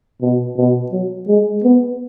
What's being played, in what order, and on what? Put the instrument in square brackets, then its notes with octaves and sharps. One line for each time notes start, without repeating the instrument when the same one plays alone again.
[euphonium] B2
B2
F#3
G#3
B3